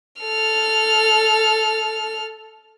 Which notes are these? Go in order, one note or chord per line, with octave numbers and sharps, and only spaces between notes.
A4 F6